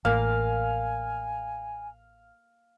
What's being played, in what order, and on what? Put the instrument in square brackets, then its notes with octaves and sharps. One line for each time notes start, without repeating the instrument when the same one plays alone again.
[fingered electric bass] A1 A2 [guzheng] A#3 [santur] F5 [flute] G#5